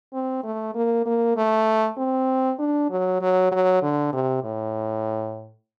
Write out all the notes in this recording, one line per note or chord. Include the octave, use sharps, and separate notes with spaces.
C4
A3
A#3
A#3
A3
C4
D4
F#3
F#3
F#3
D3
C3
A2